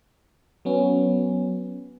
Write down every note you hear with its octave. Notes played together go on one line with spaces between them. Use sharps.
F#3 B3 C#4